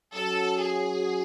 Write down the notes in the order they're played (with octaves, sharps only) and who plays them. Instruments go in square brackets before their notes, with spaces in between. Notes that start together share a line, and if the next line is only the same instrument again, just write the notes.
[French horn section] F#3 C#4 F#4 [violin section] A4
[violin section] G#4